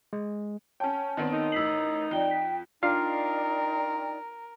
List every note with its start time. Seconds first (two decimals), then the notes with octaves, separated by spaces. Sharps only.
0.13 G#3
0.80 C#4 C#5 G5 A5
1.17 D#3 B3 C4 D5
1.32 D#4 A#4
1.52 A1 E6 B6 C7 F#7
2.11 F2 D5 G5 G7
2.31 B6
2.83 D4 D#4 F4 A#4 D5 F5 G5